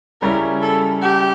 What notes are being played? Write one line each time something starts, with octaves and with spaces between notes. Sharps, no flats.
C#3 G3 C#4 E4 A#4
A4
G4